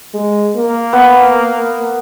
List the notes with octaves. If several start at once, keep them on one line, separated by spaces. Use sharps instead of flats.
G#3
A#3
B3